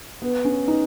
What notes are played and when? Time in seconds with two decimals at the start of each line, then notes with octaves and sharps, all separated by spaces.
0.22 B3
0.45 C#4
0.68 D#4